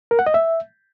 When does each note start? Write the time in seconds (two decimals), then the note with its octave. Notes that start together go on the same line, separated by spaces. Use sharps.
0.11 A#4
0.19 F#5
0.27 D#5
0.34 E5